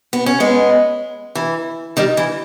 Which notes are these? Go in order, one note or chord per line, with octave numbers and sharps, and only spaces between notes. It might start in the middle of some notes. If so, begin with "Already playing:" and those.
B3
C#4
G#3 B3
E3
D#3 G3
E3